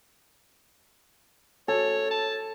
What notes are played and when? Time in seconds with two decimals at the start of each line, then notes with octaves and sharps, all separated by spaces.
1.68 A4 C#5
2.11 A5